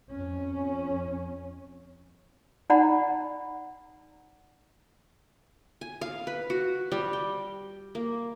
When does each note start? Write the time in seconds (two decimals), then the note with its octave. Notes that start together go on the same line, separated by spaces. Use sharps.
0.11 F2 C#4
2.70 D#4 D5 F#5 A#5 B5
5.81 G#5
6.01 F5
6.27 B4
6.50 F#4
6.92 G3
7.13 G5
7.95 A#3